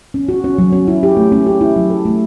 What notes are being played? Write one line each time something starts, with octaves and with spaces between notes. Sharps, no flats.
C#4
F#4
C#4
F#3
C#4
E4
G4
A3
C#4
G4
E4
F#3
A4
A3